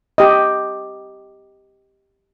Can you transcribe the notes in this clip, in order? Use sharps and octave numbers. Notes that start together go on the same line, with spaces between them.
G4 D#5